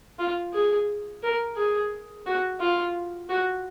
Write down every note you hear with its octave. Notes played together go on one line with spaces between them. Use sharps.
F4
G#4
A#4
G#4
F#4
F4
F#4